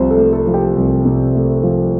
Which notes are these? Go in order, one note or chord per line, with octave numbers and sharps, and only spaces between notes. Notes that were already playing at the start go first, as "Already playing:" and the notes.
Already playing: C2 C3 F3 C5
A4
A3
A4
F3
G4
C2
C3
A3
F3